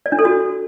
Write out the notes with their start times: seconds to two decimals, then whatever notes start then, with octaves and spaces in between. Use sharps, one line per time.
0.06 D5
0.12 D4
0.19 A4
0.25 F#4